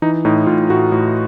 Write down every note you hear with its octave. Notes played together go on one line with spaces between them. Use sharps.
E3 D#4
A2 D#4
A2 F4
A2 F#4
A2